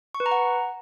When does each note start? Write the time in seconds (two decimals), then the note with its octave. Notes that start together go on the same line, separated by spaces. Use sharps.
0.15 C#6
0.20 B4
0.26 A#5
0.31 F#5